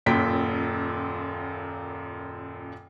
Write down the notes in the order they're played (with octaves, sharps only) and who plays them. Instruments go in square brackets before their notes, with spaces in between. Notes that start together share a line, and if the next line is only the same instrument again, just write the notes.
[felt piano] D#1 F#2 A#2 G5 B6